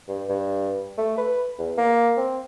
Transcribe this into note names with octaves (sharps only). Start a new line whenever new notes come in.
G2
G2
A3
B4
E2
A#3
C4